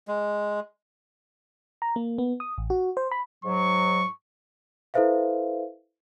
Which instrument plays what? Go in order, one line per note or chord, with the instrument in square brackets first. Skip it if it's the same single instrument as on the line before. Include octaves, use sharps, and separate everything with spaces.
[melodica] G#3
[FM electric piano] A#5
A#3
B3
D#6
A1
F#4
C5
B5
[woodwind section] G#2 F#3 [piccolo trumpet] C#6
[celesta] E4 A4 B4 C5 E5 F5